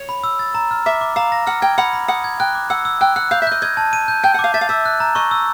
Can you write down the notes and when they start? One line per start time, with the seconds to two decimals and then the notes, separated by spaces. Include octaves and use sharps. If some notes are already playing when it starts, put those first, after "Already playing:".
Already playing: C#5
0.09 B5
0.24 E6
0.39 A6
0.55 A#5
0.71 F6
0.86 E5 D6
1.01 D6
1.16 F5 A#5
1.32 A#6
1.47 F#5 F6
1.62 G5 G#6
1.78 F#5 B5
1.93 B5
2.08 F#5 D#6
2.24 G#6
2.40 G5 F#6
2.55 D6
2.70 F#5 E6
2.85 E6
3.01 G5 F#6
3.16 F#5 F#6
3.31 F5 G6
3.42 E5
3.47 D#5 G6
3.62 D#5 G#6
3.77 A5
3.93 D#7
4.08 G6
4.24 G5 G6
4.34 F#5
4.39 F5 D6
4.54 E5 A6
4.61 F5
4.69 E5 E6
4.85 F#6
5.00 A#5
5.15 D#5 C#6
5.31 E6